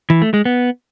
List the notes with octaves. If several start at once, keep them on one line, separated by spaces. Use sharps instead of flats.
E3
A3
G#3
B3